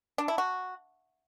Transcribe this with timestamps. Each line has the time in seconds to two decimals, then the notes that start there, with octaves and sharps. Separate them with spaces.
0.18 D4
0.28 E4
0.38 F#4